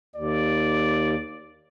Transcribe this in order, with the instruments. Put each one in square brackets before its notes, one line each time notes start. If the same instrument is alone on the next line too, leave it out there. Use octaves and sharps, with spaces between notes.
[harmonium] D#2 [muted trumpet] D5